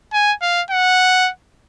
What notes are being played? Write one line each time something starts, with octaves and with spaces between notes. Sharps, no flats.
G#5
F5
F#5